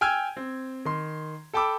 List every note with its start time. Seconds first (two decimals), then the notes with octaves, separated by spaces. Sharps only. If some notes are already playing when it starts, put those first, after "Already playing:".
0.01 G5 G#5 E6 F6 G#6
0.37 C4
0.85 D#3 C6
1.53 A4 G5 A5 B5 D6 E6